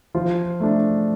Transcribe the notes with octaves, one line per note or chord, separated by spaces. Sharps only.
F3 F4
A3 D4